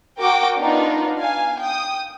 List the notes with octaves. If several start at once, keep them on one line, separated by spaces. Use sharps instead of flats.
F#4 A#4 G5 D6
B3 D4 D#4 F4
F5 G#5
G5 D#6